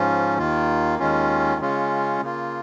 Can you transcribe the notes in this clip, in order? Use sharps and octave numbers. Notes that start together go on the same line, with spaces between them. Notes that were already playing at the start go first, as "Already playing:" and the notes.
Already playing: G#2 F3 C#4 F4
D#2 D#3 A#3 F4
D#2 D#3 G#3 C#4 F4
C#3 G#3 C#4 F4
C#3 A#3 F4